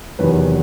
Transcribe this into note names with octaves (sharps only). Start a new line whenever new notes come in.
E2 C3 D#3 F#3 B4